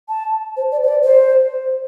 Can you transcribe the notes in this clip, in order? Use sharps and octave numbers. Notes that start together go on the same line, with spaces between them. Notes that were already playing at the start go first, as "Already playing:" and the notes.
A5
C5
D5
C5
D5
C5